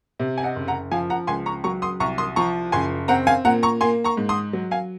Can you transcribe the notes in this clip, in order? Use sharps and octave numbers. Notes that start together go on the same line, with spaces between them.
C3
G#5
D#5 F#5
F#1
F#5 A#5
F3 F5 G#5
F#5 A#5
C#2 G#5 C6
A#5 C#6
F#3 A#5 C#6
C6 D#6
C2 A#5 C#6
C6 D#6
F3 A#5 C#6
F#1 G#5 C6
C4 F#5 A#5
F5 G#5
A#2 F#5 A#5
A#5 C#6
A#3 G#5 C6
A#5 C#6
G#2
C6 D#6
F#3
F5 G#5